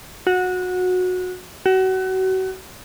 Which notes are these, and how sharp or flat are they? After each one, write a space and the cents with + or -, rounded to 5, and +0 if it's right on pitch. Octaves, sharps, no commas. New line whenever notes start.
F#4 -20
F#4 +30